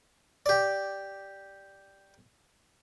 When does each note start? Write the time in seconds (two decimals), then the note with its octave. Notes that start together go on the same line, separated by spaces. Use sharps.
0.46 G4 D5